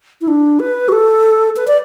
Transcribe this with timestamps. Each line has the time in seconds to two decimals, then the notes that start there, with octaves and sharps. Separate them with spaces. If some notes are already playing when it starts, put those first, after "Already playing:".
0.21 E4
0.28 D4
0.60 B4
0.89 F#4
0.92 A4
1.56 B4
1.68 D5